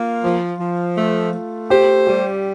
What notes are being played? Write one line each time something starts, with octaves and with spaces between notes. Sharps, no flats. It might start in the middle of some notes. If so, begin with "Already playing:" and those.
Already playing: A#3 F4
F3
F3
A3
A3
G4 C5
G3 G4